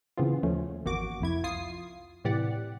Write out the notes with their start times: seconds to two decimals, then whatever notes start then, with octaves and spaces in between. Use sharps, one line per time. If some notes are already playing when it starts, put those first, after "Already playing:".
0.18 C#3 E3 B3 C4 F4
0.43 D#2 F3 A3 C#4
0.85 G#1 E2 A#3 F#4 D6
1.20 C2 F2 E4 G#6
1.44 F4 D#6 C7
2.25 A2 C3 E3 G4 D5 F#5